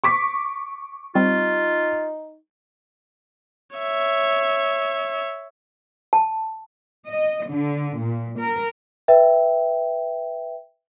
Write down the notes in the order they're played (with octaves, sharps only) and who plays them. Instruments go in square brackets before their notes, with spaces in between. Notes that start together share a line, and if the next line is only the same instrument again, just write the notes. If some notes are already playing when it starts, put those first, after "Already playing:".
[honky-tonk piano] C#6 D6 B6
[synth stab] G3 C4 [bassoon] D#4 [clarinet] F4
[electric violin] C#5 E5
[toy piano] A5
[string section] D#5
D3
A#2
A#4
[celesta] B4 E5 G5